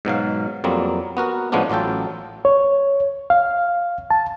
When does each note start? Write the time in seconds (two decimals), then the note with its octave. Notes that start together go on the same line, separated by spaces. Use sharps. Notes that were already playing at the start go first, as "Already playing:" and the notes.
0.05 G#2 B2 F#3 F5
0.64 F2 F#3 G3 A#3 C4
1.17 B3 F#4 A#4
1.52 A2 F3 G#3 B3 C#4 D4
1.69 A1 F#3 F4 A4 G5
2.45 C#5
3.30 F5
4.11 A5